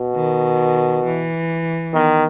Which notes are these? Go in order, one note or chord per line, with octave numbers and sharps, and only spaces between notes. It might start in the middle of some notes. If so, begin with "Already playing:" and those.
Already playing: B2
D#3
E3
D#3 B3